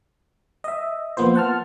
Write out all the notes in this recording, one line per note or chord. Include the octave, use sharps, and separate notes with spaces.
D#5 E5
F3 A#3 B3 F4 C5
F#5 A5 F6